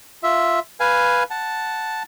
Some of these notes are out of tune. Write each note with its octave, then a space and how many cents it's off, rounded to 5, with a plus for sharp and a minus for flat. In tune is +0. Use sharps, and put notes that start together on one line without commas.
F4 +0 E5 +0
B4 +0 F5 +0 G#5 +0
F#5 +0 A5 +0